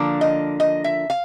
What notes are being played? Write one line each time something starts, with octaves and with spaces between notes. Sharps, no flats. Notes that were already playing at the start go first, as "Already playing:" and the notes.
Already playing: D3 F3 A#3 D4
D#5
D#5
E5
F5